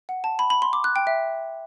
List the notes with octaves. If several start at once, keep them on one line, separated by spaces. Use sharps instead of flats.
F#5
A5
B5
B5
C6
D6
F#6
G5
E5